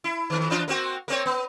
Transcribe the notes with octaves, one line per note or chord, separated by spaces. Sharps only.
E4
F2 D#3
E3 D4 F4
A#3 C4 F#4
A#3 C4 C#5
B3